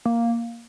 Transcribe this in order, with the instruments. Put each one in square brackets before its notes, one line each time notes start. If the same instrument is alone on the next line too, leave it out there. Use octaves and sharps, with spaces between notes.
[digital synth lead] A#3